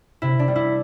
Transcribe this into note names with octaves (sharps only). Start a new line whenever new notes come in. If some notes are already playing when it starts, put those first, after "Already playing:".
C3 E4
D4
G3
E4